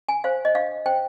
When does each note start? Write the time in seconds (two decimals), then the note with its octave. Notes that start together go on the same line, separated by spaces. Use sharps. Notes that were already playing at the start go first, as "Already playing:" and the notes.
0.09 G#5
0.24 C5 F5
0.45 D#5
0.55 D4 F5
0.86 C5 G5